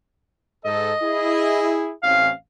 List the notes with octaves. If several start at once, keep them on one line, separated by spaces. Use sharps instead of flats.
G#2 A4 D#5
E4 G#4
A1 C3 C#4 F5